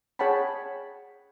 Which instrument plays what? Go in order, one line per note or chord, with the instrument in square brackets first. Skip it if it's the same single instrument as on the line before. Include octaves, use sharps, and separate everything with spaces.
[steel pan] G#4 C#5 F#5 G5 A5 B5